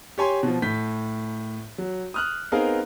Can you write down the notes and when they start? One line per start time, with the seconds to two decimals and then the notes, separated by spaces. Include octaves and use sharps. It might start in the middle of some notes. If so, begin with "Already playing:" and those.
0.18 G4 C#5 G#5 C6
0.43 B2 F3
0.62 A2 G6 B6
1.78 F#3
2.14 D#6 F6 F#6
2.52 B3 C4 D#4 G#4 A#4 F5